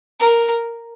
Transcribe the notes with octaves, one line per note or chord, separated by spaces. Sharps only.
A#4